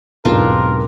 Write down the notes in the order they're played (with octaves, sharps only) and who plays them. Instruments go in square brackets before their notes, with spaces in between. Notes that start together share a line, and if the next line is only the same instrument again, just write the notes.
[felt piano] B1 E2 G#2 [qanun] C4 D4 F4 [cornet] A#4